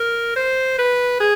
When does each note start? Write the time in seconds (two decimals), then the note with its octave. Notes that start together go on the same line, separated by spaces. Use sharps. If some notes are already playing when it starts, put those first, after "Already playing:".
Already playing: A#4
0.36 C5
0.79 B4
1.20 G#4